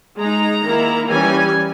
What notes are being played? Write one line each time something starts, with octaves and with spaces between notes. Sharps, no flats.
G#3 D#4 A#5
D#3 A#3 E4
E3 G3 C#4 G#5